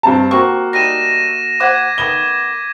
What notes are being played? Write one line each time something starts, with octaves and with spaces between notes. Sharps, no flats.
G2 C4 A5
C3 A#3 C4 F#4 C#6
G3 A3 D#4 A#6 D#7 E7
C5 F#5 D6 G#6 B6
D#3 A3 B3 G7